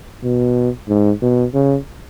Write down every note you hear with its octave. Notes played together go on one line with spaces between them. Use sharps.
B2
G#2
B2
C#3